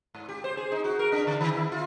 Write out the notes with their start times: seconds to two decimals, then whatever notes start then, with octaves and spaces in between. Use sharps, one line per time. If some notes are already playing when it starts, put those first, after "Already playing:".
0.14 G#2
0.28 G4
0.44 C5
0.57 G#4
0.72 D#4
0.84 F#4
0.99 A#4
1.12 D4
1.27 D3
1.41 D#3
1.53 E4
1.72 F4